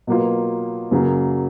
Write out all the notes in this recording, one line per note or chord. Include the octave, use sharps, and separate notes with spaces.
B2 F#3 A#3 F4
F#2 C#3 F#3 A#3